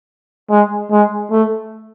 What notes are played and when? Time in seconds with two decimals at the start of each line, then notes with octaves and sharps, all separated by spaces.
0.51 G#3
0.91 G#3
1.31 A3